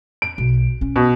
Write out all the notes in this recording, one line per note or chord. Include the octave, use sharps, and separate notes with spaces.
D7
B1
C#4
B2